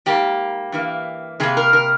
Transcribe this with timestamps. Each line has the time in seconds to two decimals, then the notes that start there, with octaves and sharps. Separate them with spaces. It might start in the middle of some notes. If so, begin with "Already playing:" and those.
0.06 G#2 G3 A#3 G4
0.72 G2 E3 A#3
1.40 C3 G3 A#3 G#4
1.57 A#4
1.73 A#4